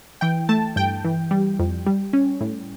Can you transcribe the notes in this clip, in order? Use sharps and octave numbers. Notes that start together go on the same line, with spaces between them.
E3 G5
A3 A5
G2 G5
E3
G3
F2
G3
C#4
A2